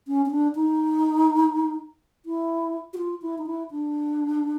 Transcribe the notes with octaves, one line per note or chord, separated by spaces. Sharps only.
C#4
C#4
D4
D#4
E4
F#4
F4
E4
D#4
E4
D4